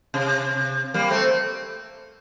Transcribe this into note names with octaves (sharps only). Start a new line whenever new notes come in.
C3
G3 A#3
A3 C4